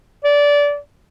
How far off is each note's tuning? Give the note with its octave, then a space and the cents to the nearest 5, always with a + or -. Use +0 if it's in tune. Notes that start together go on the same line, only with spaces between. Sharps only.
D5 -20